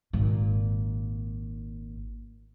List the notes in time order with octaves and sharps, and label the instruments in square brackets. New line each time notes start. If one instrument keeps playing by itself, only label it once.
[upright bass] G#1 A#2